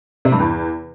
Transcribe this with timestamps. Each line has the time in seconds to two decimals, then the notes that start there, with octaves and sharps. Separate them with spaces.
0.25 C3
0.32 G2
0.40 E2